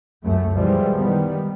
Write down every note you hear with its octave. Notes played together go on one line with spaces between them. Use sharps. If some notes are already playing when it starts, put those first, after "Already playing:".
C#2 F#2 A3
B2 E3 F3 G3 G#3
D#3 G3 B3